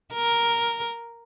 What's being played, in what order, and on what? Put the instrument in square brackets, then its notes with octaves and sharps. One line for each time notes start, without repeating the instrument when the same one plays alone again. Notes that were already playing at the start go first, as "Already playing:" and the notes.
[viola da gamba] A#4